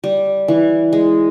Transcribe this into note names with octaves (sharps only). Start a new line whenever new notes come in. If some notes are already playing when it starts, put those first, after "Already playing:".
G3
E3
G#3